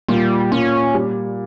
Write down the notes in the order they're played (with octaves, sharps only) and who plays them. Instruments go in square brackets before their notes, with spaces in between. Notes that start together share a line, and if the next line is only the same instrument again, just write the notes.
[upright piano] A#2 [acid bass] G3
[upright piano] A#2 [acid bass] C#4
[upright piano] G3